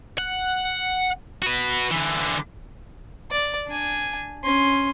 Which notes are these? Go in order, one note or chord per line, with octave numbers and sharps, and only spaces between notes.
F#5
F#4 B4
D3 E3
D5
D4 G#5
C#4 C6